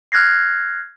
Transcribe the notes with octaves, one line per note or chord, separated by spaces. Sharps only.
F6 F#6 G#6 A#6 C7